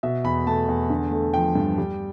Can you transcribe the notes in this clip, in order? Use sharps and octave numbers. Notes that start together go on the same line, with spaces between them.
B2 E5
E2 B5
A3 A5
E2
D3
A3
F3 G5
G2
G3